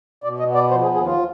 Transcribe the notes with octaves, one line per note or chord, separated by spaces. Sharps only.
B2 D5
D#5
B3
D5
F3 C5
G#4
D#2 G#4
F4